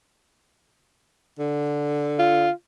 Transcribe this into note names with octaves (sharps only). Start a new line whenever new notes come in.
D3
F4